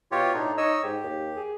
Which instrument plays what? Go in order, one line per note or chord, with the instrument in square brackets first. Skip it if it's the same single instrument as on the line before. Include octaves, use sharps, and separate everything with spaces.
[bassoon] B2 [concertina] F4 G4 C#5
[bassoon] A2 [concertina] D4 D#4
[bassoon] D#4 [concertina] C#5 D#5 E6
[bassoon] G#2 [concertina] G4
[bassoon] D#2
G#4